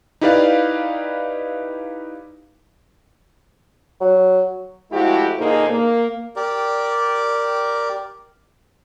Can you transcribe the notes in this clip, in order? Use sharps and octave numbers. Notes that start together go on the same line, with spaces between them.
D#4 E4 G4 B4 D5 F5
F#3
F3 G#3 A3 E4 F#4 G4
A#2 D3 A#3 D#4 G#4 C5
A#3
G4 A#4 D5